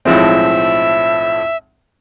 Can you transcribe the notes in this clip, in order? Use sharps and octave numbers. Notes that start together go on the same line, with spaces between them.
B1 A2 F3 G#3 C4 E5